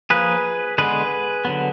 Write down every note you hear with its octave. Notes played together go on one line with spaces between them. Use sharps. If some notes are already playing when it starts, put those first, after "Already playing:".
F3 A#3 G#4 B4
D3 G#3 B3 G#4 B4
D3 F#3 B3